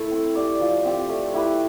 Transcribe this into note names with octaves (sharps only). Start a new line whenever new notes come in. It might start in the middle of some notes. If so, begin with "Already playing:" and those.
Already playing: A3 E4 A4
C4
G4 D5
F3
C4 G4 D5
A3
E4 G4 B4